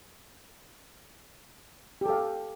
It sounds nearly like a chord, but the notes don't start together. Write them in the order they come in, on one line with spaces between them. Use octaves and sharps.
G4 A4 F5